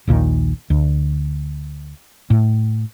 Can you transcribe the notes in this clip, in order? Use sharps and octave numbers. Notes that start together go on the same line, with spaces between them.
A#1 D#2 A#2 D#3
D2
A2